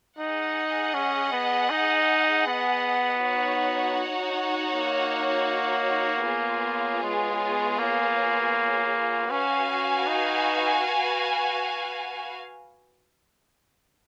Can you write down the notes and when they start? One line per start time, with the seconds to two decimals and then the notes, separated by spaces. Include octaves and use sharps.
0.18 D#4 G#4 D#5 F#5
0.94 C#4
1.32 B3
1.70 D#4
2.47 B3
3.23 D#4 F#4 C#5 F#5
4.75 A#3
6.27 B3 F4 G#4 C#5
7.03 G#3
7.79 A#3
9.30 C#4 F#4 B4 F5 G#5
10.07 D#4